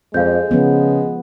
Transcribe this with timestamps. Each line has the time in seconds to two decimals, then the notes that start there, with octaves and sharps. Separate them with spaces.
0.14 F2 G#3 F5 G6
0.51 C#3 F3 B3